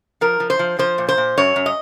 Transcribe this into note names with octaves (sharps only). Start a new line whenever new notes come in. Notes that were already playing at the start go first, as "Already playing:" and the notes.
F3 A#4
F3
C5
F3
F3 C5
A#2
C5
A#2
F#2 C#5
F#2
D#5